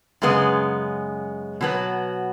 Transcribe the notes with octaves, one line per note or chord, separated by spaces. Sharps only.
F#2 C#3 G#3 B3
B2 F#3 B3